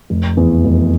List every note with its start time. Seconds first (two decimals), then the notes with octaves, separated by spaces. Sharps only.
0.10 F1
0.37 E2
0.65 F1